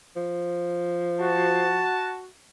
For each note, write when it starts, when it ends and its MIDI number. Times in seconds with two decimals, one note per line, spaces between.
0.16 1.92 53
1.20 2.27 66
1.20 2.21 81